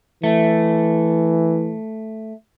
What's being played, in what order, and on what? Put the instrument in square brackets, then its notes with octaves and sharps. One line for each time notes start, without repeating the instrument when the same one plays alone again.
[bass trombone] E3 [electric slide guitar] A3